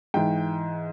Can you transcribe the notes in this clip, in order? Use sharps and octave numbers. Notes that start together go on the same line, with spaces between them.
G#2 E3 G5